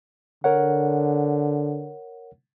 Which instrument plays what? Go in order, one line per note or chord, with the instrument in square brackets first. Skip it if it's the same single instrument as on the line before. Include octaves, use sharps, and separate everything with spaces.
[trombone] D3 [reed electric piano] A#4 C#5 F#5